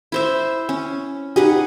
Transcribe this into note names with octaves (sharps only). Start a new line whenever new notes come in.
E4 C5 E5
C#4
D#4 G4 G#4 B4 F#5